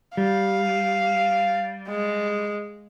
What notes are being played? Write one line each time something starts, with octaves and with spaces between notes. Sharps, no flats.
G3 F5
G#3